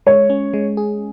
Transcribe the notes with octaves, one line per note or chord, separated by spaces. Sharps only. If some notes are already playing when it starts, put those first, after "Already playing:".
G#3 C#5
C#4
G#3
G#4